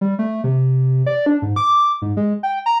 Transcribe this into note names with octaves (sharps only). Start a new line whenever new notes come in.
G3
A3
C3
D5
D4
G#2
D6
G#2
G#3
G5
A#5